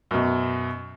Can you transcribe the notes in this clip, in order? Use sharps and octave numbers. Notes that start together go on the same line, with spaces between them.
F#2 B2